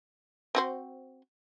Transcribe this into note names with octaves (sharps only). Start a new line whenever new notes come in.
C4 F#4 C5